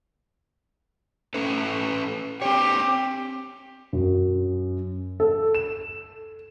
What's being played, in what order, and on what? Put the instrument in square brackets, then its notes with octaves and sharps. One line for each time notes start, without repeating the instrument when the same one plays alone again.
[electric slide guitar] C#4 A4 B4
[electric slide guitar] C4 C#5 [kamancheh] G4
[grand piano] F#2
A4
E7